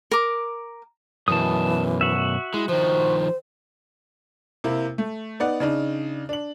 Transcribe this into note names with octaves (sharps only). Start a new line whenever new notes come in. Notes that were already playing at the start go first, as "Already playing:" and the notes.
A#4 D6
F#2 B2 E3 A5 D#6
F#4 E5
G#3 E4
D#3 F3 C5
C3 A#3 E4
A3
B3 D#4 D5 F#5
C#3 D4 D#4
D4 F#7